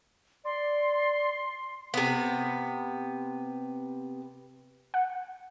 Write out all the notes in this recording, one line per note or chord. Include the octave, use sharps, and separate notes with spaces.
D5 C6
C3 B3
F#5